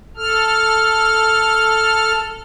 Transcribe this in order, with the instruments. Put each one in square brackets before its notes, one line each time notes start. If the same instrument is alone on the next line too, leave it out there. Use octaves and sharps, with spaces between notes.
[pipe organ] A4 F6